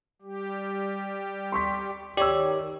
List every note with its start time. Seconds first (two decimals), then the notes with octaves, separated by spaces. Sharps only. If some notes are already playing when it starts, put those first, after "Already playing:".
0.22 G3 G4
1.52 C6 C#6 B6
2.17 D#3 G4 C#5 D5 E6